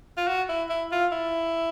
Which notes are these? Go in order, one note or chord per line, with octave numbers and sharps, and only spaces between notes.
F4
F#4
E4
E4
F4
E4